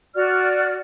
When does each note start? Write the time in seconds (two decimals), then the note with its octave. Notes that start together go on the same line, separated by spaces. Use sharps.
0.14 F#4 D5 F6